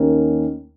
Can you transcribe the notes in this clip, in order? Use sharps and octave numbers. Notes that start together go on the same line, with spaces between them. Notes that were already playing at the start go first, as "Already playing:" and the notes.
Already playing: D#2 D#3 A#3 C#4